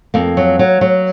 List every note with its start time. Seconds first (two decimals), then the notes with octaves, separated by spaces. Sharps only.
0.14 F2 A#3
0.37 F#3
0.59 F#3
0.81 F#3